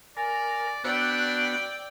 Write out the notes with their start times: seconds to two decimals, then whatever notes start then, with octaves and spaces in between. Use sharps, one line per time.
0.17 A#4 D5 G#5
0.84 B3 D4 F#4 D5 G5 E6